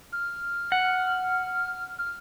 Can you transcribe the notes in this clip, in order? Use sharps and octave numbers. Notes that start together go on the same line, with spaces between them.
F6
F#5
F6